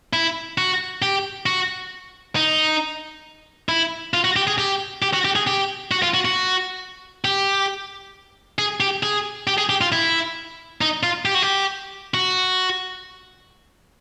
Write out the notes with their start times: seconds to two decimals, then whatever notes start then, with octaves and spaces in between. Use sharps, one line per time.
0.13 E4
0.58 F#4
1.02 G4
1.46 F#4
2.36 D#4
3.69 E4
4.14 F4
4.24 F#4
4.36 G4
4.47 G#4
4.58 G4
5.02 G4
5.14 F#4
5.25 G4
5.36 G#4
5.47 G4
5.91 F#4
6.03 F4
6.14 F#4
6.25 F#4
7.25 G4
8.59 G#4
8.80 G4
9.03 G#4
9.47 G4
9.58 G#4
9.69 G4
9.81 F4
9.92 E4
10.81 D#4
11.03 F4
11.25 G4
11.34 F#4
11.42 G4
12.14 F#4